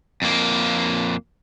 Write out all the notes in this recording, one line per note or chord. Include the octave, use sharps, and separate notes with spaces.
F2 A#3